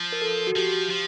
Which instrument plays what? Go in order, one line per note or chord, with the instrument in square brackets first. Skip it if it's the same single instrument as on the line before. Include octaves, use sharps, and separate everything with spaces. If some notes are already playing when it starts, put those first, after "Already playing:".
Already playing: [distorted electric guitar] F3
[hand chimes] A#4
A4
F#4
[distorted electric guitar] F3 [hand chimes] G4
[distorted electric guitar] F3